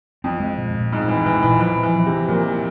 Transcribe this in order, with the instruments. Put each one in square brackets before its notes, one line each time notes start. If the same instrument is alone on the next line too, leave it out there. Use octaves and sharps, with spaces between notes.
[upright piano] F2 [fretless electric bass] C4
[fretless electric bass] G#3
A#2
A#2
[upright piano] G#2 [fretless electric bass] C4
[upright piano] E3 [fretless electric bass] G#3
[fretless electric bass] A#2 [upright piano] E3
[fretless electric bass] A#2 [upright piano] E3
[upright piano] E3 [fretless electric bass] F3
[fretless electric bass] C4
[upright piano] E3
[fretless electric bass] F3
[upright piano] C3 [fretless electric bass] C4
[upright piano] A#2 [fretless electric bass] F3
[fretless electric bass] C4